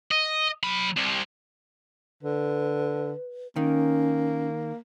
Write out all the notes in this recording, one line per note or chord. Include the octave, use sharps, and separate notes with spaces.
D#5
F#3 B5
C2 C3
D3 B4
D#3 A#3 C#4